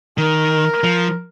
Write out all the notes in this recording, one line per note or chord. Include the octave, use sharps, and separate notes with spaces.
D#3 A#4
F3